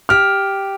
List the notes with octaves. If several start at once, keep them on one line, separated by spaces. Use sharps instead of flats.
G4 F6